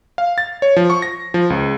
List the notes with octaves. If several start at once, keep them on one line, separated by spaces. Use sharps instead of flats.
F5
A6
C#5
F3
C#6
A#6
F3
C#2